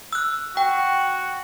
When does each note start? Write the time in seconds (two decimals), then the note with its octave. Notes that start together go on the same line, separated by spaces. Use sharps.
0.13 E6 F#6
0.57 F#4 G5